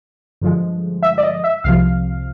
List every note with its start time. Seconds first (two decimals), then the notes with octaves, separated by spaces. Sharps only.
0.41 G2 D3 F3 G#3
1.03 E5
1.18 D5
1.23 D#5
1.44 E5
1.64 C2 C3 F3 F5